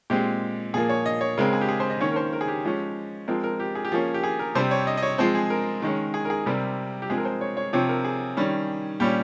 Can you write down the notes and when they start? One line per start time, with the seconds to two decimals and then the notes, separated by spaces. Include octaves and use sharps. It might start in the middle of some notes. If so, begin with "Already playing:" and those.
0.10 A#2 G#3 C4 G4
0.74 A#2 F3 A#3 G#4
0.89 C#5
1.06 D#5
1.21 C#5
1.38 C#3 G#3 C4 A#4
1.53 G#4
1.61 G4
1.69 G#4
1.80 C5
1.90 D#5
2.00 D#3 A#3 C#4 C#5
2.12 A#4
2.16 C5
2.33 A#4
2.41 G#4
2.48 G4
2.64 F3 G#3 C#4
3.28 F3 G#3 C4 A#4
3.44 A#4
3.60 G4
3.75 G#4
3.85 G4
3.92 F3 A#3 C#4 G#4
4.14 G4
4.24 G#4
4.39 A#4
4.55 C3 G3 C4 C5
4.71 C#5
4.87 D#5
4.97 D#5
5.02 C#5
5.18 F3 G#3 C4 C5
5.35 G#4
5.50 A#4
5.82 D#3 G#3 C#4
6.14 G#4
6.25 A#4
6.30 G#4
6.46 C3 G3 C4 A#4
7.02 G4
7.10 F3 G#3 C4 G#4
7.17 A#4
7.25 C5
7.41 C#5
7.57 C#5
7.73 C3 F3 C4 C#5
7.89 A#4
8.05 G#4
8.37 D#3 G3 C#4
9.00 A#2 G3 C#4 G4